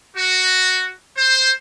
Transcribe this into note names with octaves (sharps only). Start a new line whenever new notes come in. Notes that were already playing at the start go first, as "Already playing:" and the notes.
F#4
C5